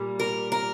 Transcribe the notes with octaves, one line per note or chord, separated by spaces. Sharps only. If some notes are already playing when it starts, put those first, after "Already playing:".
Already playing: A#2 G3 A#3
A#4
A#4